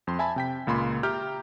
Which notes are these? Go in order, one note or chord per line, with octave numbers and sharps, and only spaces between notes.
F2 C6
E5 G#5 A5 B5
C3 G5 B6
C#2 A#2 B5 C6
G4 E5 G5 A#5 F6 G6